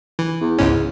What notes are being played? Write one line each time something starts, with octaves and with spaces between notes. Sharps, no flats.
E3
E2
C#2 G#2 C#4